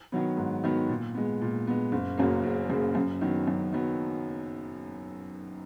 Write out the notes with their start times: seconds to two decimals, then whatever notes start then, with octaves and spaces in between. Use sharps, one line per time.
0.12 D#3 F#3 B3
0.37 G#2
0.64 D#3 F#3 B3
0.89 A#2
1.15 G#3 B3
1.42 A#2
1.67 G#3 B3
1.92 F#1
2.18 F#2 C#3 F#3 A#3
2.44 F#1
2.69 F#2 C#3 F#3 A#3
2.95 F#2
3.21 D#3 F#3 B3
3.47 F#2
3.73 D#3 F#3 B3